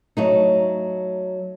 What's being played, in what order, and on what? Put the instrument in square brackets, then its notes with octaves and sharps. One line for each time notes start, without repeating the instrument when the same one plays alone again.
[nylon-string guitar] F#3 A3 D#4